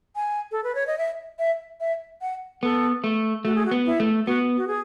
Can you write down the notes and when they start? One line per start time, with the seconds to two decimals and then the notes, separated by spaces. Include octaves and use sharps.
0.16 G#5
0.52 A4
0.64 B4
0.75 C#5
0.87 D#5
0.98 E5
1.39 E5
1.80 E5
2.21 F#5
2.62 B3 A4
3.04 A3
3.45 A3 F#4
3.55 G#4
3.66 F#4
3.71 B3
3.86 E4
4.00 A3
4.26 B3 F#4
4.57 F#4
4.68 G#4